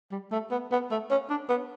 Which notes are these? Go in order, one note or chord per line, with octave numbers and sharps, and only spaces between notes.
G3
A3
B3
B3
A3
C#4
D4
B3